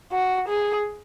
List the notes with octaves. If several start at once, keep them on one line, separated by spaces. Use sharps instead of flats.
F#4
G#4